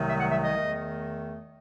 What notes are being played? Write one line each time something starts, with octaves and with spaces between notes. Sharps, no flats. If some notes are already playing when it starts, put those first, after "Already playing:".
Already playing: C2 C3 D#3 F#3 A3
E5
F#5
E5
D#5
E2 D#3 A3